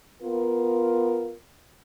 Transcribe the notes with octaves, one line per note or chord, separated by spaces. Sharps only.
B3 F4 A#4